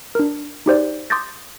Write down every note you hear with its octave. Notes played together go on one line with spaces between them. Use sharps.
D4 A#4
D#4 G4 C5 D5
C6 D6 D#6 G6 A6 A#6